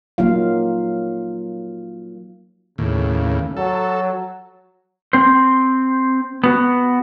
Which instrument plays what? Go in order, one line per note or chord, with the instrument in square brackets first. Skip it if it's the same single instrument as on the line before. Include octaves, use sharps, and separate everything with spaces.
[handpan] F#3 A#3 D#4 F4 F5
[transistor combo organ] D#2 A2 [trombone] C#3
[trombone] F#3 [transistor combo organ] A4
[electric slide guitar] C4 C5
B3 F#4